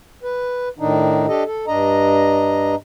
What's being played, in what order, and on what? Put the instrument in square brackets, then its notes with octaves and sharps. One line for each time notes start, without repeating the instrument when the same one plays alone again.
[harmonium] B4
A2 D#3 D4 D#4
D4 G4 A4 D#5
A4
G2 D4 D#5 A#5